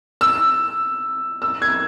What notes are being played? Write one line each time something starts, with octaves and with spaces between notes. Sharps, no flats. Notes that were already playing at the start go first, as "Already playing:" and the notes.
E6
E6
G#6